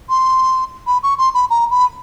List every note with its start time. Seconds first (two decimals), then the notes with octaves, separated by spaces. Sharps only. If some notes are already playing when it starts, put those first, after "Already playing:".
0.09 C6
0.87 B5
1.03 C#6
1.18 C6
1.34 B5
1.50 A#5
1.71 B5